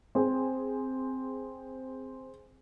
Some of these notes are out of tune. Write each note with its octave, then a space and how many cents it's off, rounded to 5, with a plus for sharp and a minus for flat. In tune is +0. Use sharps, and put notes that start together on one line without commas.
C4 +0 G#4 +0